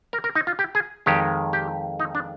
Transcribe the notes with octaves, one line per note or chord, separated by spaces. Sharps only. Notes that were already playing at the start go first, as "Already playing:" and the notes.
A#4
A#4
D#4
F4
G4
G#4
F2 D#3 G#3 G4
G4
D#4
D4